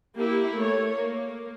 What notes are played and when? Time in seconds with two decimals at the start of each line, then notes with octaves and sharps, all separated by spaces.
0.18 A#3 E4 G4
0.56 A3 C#5
0.95 A#3